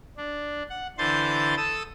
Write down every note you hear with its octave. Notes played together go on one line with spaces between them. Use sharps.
D4
F#5
D3 E3 C5 C6 G6 A6
A4 A5 D#6 E6